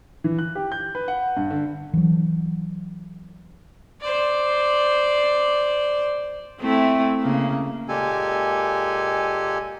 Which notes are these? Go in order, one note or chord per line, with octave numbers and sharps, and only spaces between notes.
E3
F#6
G4
G6
B4
F#5
G2
D3
E3 F#3
C5 D5
A3 C4 E4
C#3 A#3
A#2 G#3 A#3 G4 A4 G#5